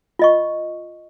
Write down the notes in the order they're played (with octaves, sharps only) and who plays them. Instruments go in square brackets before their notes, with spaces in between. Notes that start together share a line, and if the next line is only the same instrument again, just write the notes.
[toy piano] F4 D#5 C#6